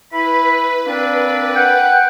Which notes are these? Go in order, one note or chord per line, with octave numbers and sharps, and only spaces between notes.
E4 B4 B5
A#3 C4 D4
F#5 G5